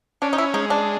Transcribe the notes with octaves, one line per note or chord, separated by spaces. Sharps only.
C#4 D4
D#4
E4
G#3 D#4
D4